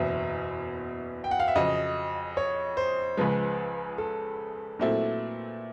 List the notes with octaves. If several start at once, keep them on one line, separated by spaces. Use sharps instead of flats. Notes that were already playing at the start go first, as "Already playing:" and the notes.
Already playing: F#1 E2 B2 E5
G5
F#5
F5
E5
F2 C#3 F#3 D#5
C#5
C5
C#2 C#3 F3 G#3 B4
A4
A#2 F#3 A3 C4 E4